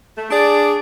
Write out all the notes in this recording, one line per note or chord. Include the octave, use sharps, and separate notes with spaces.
A3
D4 G#4 D5